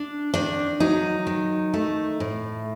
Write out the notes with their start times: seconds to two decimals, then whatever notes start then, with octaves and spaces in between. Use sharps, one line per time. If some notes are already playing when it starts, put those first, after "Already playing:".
Already playing: D4
0.34 D#3 D4
0.80 F#3 D#4
1.27 D#3
1.74 A3
2.20 A2